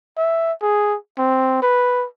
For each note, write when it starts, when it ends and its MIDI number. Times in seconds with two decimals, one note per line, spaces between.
0.18 0.52 76
0.62 0.96 68
1.18 1.62 60
1.63 2.07 71